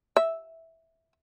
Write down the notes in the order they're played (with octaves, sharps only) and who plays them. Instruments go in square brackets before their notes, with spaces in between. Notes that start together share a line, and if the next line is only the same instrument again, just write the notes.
[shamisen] E5